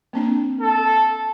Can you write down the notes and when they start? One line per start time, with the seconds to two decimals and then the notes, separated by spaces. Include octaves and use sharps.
0.13 A#3 C4 D4
0.61 A4